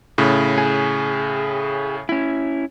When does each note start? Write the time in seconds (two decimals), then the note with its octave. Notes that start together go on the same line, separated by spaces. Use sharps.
0.18 A2 C#3
0.58 G#4
2.09 C#4 E4